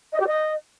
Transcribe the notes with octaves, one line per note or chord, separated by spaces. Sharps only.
D#5
G4
D#5